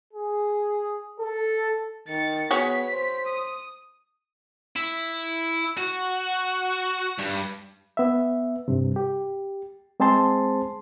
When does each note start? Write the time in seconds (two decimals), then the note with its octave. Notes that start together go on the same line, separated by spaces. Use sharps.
0.13 G#4
1.20 A4
2.08 D#3 A6 C#7
2.51 B3 F#4 G#4 C#5 B6
2.93 C5
3.26 D#6
4.76 E4
5.77 F#4
7.18 G2
7.97 B3 E5
8.68 G2 C3
8.96 G4
10.00 G#3 C4 G#4 C5 A5 C6